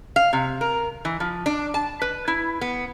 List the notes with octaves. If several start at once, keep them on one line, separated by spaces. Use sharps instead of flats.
F5
C3
A#4
E3
F3
D4
A5
B4
E4
B3